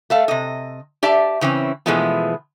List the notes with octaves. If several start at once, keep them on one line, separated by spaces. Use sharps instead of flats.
A3 A4 F5
C3 D#5
G4 D5 E5 A5
C#3 E3 C4 C#4
B2 E3 F3 G#3 A3 B3